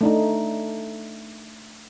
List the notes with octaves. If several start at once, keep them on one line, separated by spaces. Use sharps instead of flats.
A3 D4 D#4